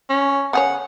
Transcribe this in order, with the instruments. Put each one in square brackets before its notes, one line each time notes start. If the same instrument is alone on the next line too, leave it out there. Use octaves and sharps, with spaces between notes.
[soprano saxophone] C#4
[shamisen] C#3 G#4 C#5 [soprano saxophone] F#5